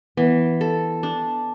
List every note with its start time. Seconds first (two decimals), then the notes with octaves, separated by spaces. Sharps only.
0.17 E3 B3
0.61 A4
1.03 D4